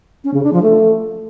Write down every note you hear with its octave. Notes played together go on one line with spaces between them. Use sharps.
C#4
C#3
D4
F3
A3